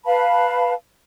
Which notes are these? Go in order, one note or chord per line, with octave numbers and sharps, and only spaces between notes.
B4 F5 A5 B5